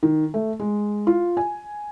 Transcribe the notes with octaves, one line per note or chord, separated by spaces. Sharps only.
D#3
A3
G#3
F4
G#5